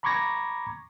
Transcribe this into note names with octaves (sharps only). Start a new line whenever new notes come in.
A#5 B5 C#6 D6 G#6 A#6